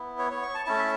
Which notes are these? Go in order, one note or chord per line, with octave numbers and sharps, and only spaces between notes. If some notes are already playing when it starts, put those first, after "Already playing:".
Already playing: B3 E4
C#5
C#5
C#6
A5
A3 C#4 E4 A5
E5